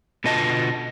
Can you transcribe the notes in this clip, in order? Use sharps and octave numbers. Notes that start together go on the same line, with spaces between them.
B2 D3 B3 F4 D#5 A5